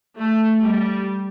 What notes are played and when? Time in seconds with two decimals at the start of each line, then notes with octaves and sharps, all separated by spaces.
0.18 A3
0.63 G3